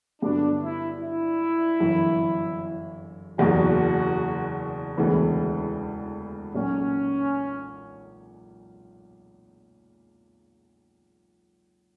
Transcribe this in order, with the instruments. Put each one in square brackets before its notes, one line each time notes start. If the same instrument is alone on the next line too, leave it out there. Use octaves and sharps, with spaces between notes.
[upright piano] G2 D3 F#3 B3 [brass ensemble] D4
[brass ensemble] E4
E4
[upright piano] G1 F#2 E3
[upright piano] F#1 E2 B2 G3 A#3 [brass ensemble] F#4
[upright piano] E1 D2 C#3 E3 B3
[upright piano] B1 A#2 A#3 [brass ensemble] C#4